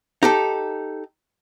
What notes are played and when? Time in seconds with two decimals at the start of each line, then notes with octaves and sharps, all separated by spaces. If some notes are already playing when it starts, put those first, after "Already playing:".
0.23 D#4 G4 A4